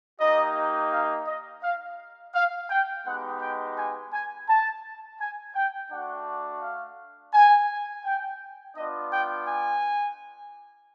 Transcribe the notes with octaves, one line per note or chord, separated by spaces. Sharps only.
A#3 D#4 G4 D#5
F5
D#5
F5
F5
G5
G#3 B3 D#4 G4 F#5
G5
G#5
G#5
A5
G#5
G5
A3 D4 F#4 F#5
F5
G#5
G5
B3 D4 F4 D#5
G5
G#5